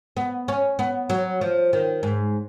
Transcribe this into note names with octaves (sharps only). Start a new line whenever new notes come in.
B3
C#4
B3
F#3
F3
D#3
G#2